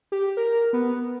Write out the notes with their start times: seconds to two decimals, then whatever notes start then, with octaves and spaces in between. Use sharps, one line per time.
0.12 G4
0.37 A#4
0.73 B3